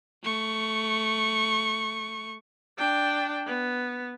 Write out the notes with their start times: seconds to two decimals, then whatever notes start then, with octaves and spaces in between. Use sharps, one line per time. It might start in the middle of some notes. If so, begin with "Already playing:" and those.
0.24 A3 C#6
2.78 D4 G5
3.46 B3